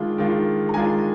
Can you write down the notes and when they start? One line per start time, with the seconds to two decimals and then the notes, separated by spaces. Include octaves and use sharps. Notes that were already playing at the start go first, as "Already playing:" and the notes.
Already playing: D#3 G#3 D4 F4
0.18 D#3 G#3 D4 F4
0.69 A#5
0.74 D#3 G#3 D4 F4 G#5